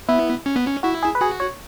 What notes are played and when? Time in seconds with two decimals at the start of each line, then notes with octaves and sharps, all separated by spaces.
0.09 B3 E4
0.46 C#4
0.56 B3
0.66 C#4
0.83 E4 F#4
1.03 G#4
1.15 B4
1.21 F#4 G#4
1.40 C#5